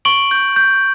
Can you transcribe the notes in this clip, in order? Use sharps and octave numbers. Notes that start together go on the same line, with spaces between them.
C#6 D7 F#7
G6
G6